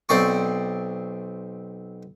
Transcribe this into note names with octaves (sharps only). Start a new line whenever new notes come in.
B1 C4 D5 C#6